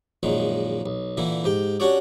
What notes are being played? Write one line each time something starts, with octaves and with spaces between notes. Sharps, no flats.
A#1 F#2 A#2 D#3 G#3
B1
A#2 D3 E3 E4
G#2 G4 G5
C#4 D4 F#4 G4 C#5 D5